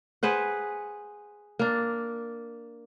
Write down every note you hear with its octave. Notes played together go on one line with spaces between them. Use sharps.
G#4 B4 C5 F#5
A#3 D4